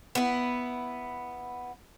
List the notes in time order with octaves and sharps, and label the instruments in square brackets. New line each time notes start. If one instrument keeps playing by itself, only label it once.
[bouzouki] B3 E4